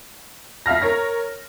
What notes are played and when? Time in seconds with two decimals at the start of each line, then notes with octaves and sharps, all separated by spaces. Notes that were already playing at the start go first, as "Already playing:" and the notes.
0.66 F2 E5 F5 F6 A#6
0.82 A#4 C#5 A#6